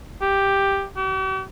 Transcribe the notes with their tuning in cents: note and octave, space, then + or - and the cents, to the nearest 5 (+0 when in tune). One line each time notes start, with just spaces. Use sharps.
G4 +5
G4 -45